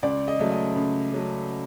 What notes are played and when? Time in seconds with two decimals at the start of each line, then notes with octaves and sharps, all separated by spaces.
0.03 C#2 D5
0.28 D#5
0.39 C#3 F#3 A3
0.51 D#5
0.76 C#2
1.12 C#3 F#3 A3